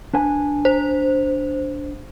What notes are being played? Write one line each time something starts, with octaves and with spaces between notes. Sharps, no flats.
D4 B4 G#5
C5